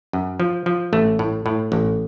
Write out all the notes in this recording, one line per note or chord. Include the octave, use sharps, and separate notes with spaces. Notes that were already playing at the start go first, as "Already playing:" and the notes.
F#2
F3
F3
A1 A3
A2
A2
A1